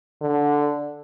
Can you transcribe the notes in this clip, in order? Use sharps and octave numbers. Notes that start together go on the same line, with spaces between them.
D3